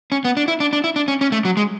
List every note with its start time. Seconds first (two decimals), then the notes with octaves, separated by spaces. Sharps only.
0.12 C#4
0.25 B3
0.37 D4
0.48 E4
0.60 D4
0.73 D4
0.84 E4
0.96 D4
1.08 C#4
1.21 C#4
1.32 A3
1.45 F#3
1.57 G#3